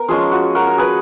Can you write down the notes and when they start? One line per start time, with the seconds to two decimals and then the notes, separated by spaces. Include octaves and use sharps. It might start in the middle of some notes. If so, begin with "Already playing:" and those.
Already playing: B3 A#4
0.08 F3 G#3 C#4 F4 G#4
0.32 F#4
0.55 F#4 A#4
0.67 A#4
0.78 G#4 B4